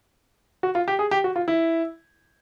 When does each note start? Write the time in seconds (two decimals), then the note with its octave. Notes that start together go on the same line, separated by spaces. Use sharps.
0.63 F#4
0.75 F4
0.88 G4
0.99 G#4
1.11 G4
1.24 F#4
1.36 F4
1.48 E4